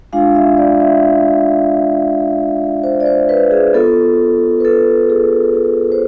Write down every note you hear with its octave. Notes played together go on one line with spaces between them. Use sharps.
G#3 D4 F4 F5
E5
D5
E5
C5
D5
C5
B4
G#4
B3 F4 A4
B4
A4
G#4
A4
C5